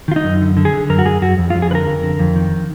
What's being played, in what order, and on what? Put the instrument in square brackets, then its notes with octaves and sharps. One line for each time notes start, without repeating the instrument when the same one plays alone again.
[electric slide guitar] D#3 F4
D#4
F#2
D3
D3
G#4
D3
F#2 A#4
F#4
F#2 G#4
F#2 F#4
F2
F4
F2
G#4
D3 B4
A#4
F2
D3
F2
D#3